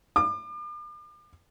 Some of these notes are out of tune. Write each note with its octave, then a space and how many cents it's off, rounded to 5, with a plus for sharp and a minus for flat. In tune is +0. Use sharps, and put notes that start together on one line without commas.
D6 +40